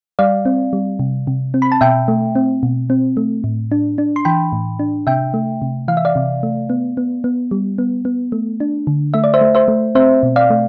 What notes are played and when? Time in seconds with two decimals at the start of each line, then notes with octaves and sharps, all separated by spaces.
0.19 G3 D5 F5
0.45 C4
0.73 G3
0.99 C3
1.27 C3
1.54 C4
1.62 B5
1.72 A5
1.81 B2 E5 G5
2.08 A3
2.35 C4
2.63 B2
2.90 C4
3.17 A3
3.44 A2
3.72 D4
3.98 D4
4.16 C6
4.25 E3 G5 B5
4.52 A2
4.79 D4
5.07 C3 E5 G5
5.34 A3
5.62 C3
5.88 E3 F5
5.97 E5
6.05 D5 F5
6.16 C3
6.43 A3
6.70 B3
6.97 B3
7.24 B3
7.51 G3
7.78 B3
8.05 B3
8.32 A3
8.60 D4
8.87 D3
9.14 A3 E5
9.24 D5
9.34 C5 E5
9.41 A3
9.55 C5 E5
9.68 A3
9.95 C4 C5 E5
10.23 B2
10.36 D5 F5
10.50 A3